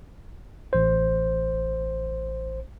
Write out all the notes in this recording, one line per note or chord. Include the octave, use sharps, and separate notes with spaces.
A1 C5